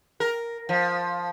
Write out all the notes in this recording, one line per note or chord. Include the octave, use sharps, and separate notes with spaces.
A#4
F3